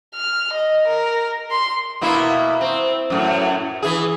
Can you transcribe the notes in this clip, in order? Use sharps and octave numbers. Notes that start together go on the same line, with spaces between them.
F6
D#5
A#4
C6
B2 A#3 E4
C4
F#2 A2
E3 G#4